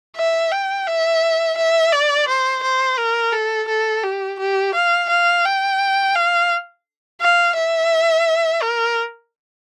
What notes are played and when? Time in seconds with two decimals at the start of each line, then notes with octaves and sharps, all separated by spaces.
0.17 E5
0.52 G5
0.87 E5
1.57 E5
1.92 D5
2.28 C5
2.63 C5
2.98 A#4
3.33 A4
3.68 A4
4.03 G4
4.39 G4
4.74 F5
5.09 F5
5.44 G5
6.15 F5
7.21 F5
7.55 E5
8.62 A#4